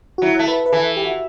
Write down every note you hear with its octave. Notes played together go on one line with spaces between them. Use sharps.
F#4
F#3 E4
A3
B4
B4
E3 A4
G4
F#4